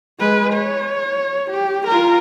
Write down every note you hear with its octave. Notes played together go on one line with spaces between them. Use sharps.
G#3 B4
C#5
G4
F4 A#4